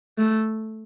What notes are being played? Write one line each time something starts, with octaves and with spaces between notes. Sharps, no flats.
A3